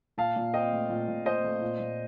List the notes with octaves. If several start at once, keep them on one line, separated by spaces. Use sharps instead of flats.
A#2 F5 A5
A#2
C4 D#5 G5
A3
A#2
A#2
C4 C5 D#5
A3
A#2
A#2